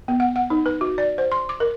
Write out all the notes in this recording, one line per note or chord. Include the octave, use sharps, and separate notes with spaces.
B3
F#5
F#5
D#4
B4
F#4
D5
C5
C6
D6
A#4